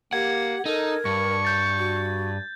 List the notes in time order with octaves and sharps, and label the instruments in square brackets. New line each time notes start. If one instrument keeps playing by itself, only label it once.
[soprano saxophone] A#3 [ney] G4 [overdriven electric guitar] F#5 [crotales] G#6
[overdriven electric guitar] D#4 [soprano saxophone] A4 [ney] A#4
[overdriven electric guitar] G2 [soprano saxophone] C#6
[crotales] G6 A6
[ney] F#4